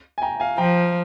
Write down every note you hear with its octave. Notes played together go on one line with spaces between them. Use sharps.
G#5
G5 A#5
F5 G#5
F3 G5 A#5